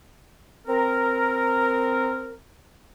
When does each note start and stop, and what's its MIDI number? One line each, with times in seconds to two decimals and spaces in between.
0.67 2.33 60
0.67 2.33 70